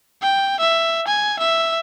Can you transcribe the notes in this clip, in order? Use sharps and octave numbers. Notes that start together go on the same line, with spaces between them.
G5
E5
G#5
E5